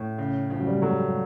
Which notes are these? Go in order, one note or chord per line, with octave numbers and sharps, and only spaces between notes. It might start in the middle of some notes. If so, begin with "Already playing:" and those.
Already playing: A2
C#3
C#3 F3
F#3
G3
G#3
F#3 A3
G3